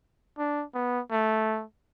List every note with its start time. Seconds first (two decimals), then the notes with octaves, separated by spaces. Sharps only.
0.38 D4
0.74 B3
1.11 A3